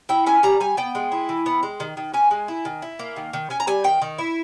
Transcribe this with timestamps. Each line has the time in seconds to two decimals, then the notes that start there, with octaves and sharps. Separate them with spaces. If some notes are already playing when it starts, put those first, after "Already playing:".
0.09 E4 G5
0.26 C#4 G#5
0.43 G3 A#5
0.60 G3 G#5
0.77 B3 G5
0.95 G#3
1.12 E4
1.29 E3
1.46 B3
1.63 G#3
1.80 D#3
1.97 D#3
2.13 C#4 G#5
2.31 G#3
2.48 E4
2.65 D#3
2.82 E4
2.99 A#3
3.16 D#3
3.33 D#3
3.50 C#4 G#5
3.60 A#5
3.67 G3 G#5
3.84 D#3 G5
4.02 D#3
4.18 E4